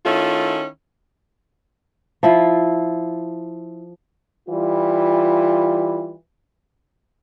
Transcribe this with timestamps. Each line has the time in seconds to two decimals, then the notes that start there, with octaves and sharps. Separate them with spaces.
0.06 D#3 A3 C#4 E4 F4
2.23 F3 E4 F4
4.49 E3 G3 F4